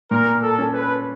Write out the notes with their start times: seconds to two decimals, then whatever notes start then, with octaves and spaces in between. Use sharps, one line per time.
0.11 A#2 A#4
0.43 A4
0.58 C#4
0.74 B4